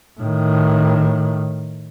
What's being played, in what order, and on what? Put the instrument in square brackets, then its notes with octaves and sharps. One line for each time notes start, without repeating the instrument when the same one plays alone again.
[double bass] A2 D#3